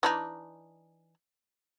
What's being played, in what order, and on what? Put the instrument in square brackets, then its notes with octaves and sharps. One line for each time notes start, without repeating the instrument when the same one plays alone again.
[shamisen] E3 D4 D#4